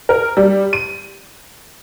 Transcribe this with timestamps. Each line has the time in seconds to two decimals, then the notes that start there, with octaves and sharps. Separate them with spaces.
0.09 A#4
0.37 G3
0.73 D#7